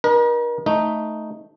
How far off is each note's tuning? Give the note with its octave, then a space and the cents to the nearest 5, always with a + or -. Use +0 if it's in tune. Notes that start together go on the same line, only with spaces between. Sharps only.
D#4 -35 A#4 +40
A3 +0 D#4 +0